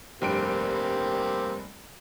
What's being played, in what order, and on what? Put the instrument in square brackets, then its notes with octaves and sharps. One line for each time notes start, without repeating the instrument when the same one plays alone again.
[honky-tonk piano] F1 G2 D7 [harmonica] A#3 C4 G4